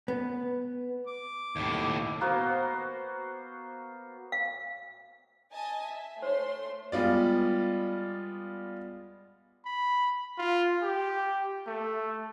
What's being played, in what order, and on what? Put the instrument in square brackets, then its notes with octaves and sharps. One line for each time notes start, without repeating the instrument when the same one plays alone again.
[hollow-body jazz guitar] B3
[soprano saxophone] D6
[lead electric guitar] D#2 A2
[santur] A#3 B3 F#4 C5
[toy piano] F5
[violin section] D#5 G#5 A5
E5
[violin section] A3 C6 [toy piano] C5 C#5
[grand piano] G3 G#3 B3 F4 D5
[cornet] B5
F4
G4
A3